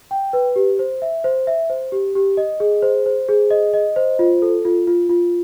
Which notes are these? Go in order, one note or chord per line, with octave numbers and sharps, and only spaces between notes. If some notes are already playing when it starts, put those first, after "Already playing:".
G5
B4
G4
C5
E5
C5
E5
C5
G4
G4
D#5
G#4
C5
C5
G#4
D#5
D#5
C5
F4
A4
F4
F4
F4